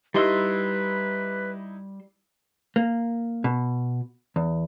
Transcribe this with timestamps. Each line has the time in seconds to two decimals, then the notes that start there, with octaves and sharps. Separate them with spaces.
0.14 G3 D#4 E4 G4 B4 D#5 C6 E6
2.76 A#3
3.44 B2
4.36 E2